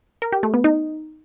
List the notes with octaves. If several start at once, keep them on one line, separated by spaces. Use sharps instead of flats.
A#4
G4
A3
B3
D#4